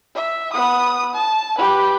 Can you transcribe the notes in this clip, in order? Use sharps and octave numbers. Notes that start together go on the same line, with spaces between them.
E5
B3 D#6
A5
G4 B4